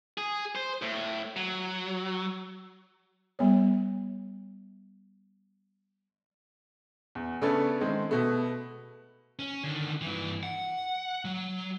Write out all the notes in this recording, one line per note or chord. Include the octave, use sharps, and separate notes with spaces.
G#4
C5
A2
F#3
G3 B3 C#5
E2
C#3 A3 B3 C#4 D4 A4
D#3 G#3 A3 C4 C#4
B2 A3 B3
C#4
D3 D#3
G2 E3
F#5
F#3